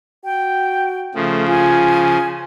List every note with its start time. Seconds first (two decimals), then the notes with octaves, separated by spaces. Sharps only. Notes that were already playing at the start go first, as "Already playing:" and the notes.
0.24 F#4 G5
1.15 C#3 F3 A3
1.48 F4 G#5